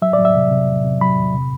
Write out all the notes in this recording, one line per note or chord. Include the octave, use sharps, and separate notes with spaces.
F#3 E5
D5
F#3
E5
C3
C3
E2
C3
F#3 B5
E2
C3